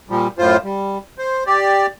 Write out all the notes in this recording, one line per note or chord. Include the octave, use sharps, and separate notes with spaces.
A#2 F3 G3
F#2 A2 F4 C5
G3
C5
G4 D5